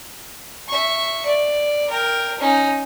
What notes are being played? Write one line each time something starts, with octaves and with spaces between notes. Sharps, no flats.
E5 C#6
D5
A#4 G5
C#4 D#4